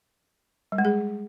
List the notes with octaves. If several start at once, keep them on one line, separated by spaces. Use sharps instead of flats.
G3
G#3
G#4